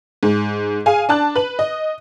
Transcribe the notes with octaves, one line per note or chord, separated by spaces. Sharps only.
G#2
G#4 F5 G#5
D4 A5 F#6
B4 F#7
D#5